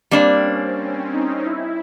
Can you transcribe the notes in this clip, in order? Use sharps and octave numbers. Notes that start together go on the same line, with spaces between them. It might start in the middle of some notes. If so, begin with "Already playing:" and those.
G3 A#3 C4 D4
C#4
C#4
D#4
E4